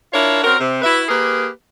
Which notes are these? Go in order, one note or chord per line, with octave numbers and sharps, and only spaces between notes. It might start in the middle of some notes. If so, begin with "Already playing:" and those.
D4 E4 F4 A#4 C#5
C4 C#4 F#4 A#4
C3
E4 F#4 B4 E5
A#3 G4 G#4 A#4 B4